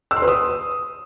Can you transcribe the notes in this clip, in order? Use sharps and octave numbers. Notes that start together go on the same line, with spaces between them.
E6
C6
B4
D#6